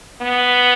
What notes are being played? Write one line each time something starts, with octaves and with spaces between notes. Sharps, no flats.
B3